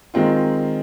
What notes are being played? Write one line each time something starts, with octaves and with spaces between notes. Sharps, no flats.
D#3 G#3 C4 F4